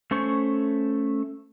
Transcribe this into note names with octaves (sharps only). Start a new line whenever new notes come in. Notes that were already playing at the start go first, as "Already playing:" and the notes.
A3 C#4 C5 C#6